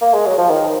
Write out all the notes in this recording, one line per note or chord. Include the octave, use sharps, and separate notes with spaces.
A#3
G#3
F#3
F3
D#3